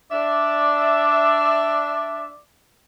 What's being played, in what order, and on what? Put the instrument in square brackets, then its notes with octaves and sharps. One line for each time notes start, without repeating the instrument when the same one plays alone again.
[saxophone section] D4 E5 [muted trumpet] D5